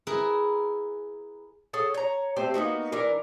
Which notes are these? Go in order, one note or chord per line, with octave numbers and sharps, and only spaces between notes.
E4 G#4 A#4 B4
G#4 A4 C#5 F#5
C#5 A#5
A3 C4 G4 C5
A#3 B3 D#4 F#4
E3 D4 A#4